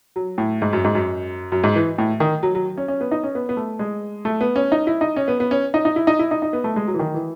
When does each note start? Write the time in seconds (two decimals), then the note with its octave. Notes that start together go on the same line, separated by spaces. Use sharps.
0.16 F#3
0.38 A2
0.62 G#2
0.73 F#2
0.84 G#2
0.95 F#2
1.52 F#2
1.64 G#2
1.76 E3
1.98 A2
2.20 D#3
2.43 F#3
2.55 F#3
2.77 C#4
2.88 C#4
3.01 B3
3.11 D#4
3.24 C#4
3.35 B3
3.49 B3
3.57 A3
3.79 G#3
4.25 A3
4.41 B3
4.56 C#4
4.72 D#4
4.87 E4
5.01 D#4
5.16 C#4
5.28 B3
5.40 B3
5.51 C#4
5.74 D#4
5.85 D#4
5.96 E4
6.07 D#4
6.19 E4
6.31 D#4
6.42 D#4
6.53 B3
6.64 A3
6.76 G#3
6.88 F#3
6.94 E3
6.99 D#3
7.14 E3